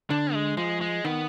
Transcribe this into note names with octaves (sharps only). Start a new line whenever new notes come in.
D3 D4
G#3
F3 G#3
G#3
D#3 B3